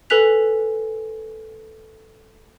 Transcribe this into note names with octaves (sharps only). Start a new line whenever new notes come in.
A4 B4 G#5 F#6 B6 F7